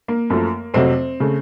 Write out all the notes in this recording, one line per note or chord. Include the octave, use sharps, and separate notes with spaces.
A#3
F#2 F3 A3
F2 C3 F#3 A3 C4
C#3 A3